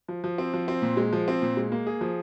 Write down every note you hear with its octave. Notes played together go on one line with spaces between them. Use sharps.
F3
F3
C4
F3
C4
A#2
G#3
F3
C4
A#2
G#3
A#3
G#4
F3